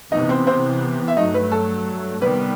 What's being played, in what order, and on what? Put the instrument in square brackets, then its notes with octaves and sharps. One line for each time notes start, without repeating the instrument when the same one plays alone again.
[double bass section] C3 E3 B3 [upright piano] D#4 D#5
[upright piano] C4 C5
C4 C5
E5
[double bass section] G2 F#3 A3 [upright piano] D#4 D#5
[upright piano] B4
A4
[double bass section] C3 D#3 G3 B3 [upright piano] B4